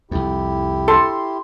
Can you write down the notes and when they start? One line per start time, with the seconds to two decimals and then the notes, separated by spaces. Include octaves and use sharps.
0.11 C2 F2 E4 G4
0.88 A4 C6